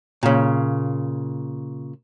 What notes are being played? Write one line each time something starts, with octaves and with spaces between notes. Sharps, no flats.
A#2 C#3